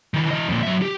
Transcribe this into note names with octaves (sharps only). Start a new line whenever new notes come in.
D#3 E3
E3 D#5
F2 A#2
F#3 E5
G4